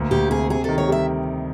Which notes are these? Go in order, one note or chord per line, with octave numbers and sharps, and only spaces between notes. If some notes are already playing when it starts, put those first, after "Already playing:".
Already playing: D2 A#3
D2 G4
C3 G#4
C3 G#4
D#3 A4
C#5
G3 E5